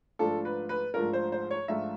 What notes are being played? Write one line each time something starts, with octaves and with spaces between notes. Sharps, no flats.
G#2 F3 A3 D4 F4 A4
B4
B4
G#2 F3 A3 D4 F4 A#4
C5
C5
C#5
G#2 F3 A3 D4 F4 E5